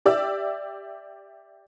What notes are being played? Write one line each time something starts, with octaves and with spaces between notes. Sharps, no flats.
G4 D5 E5 E6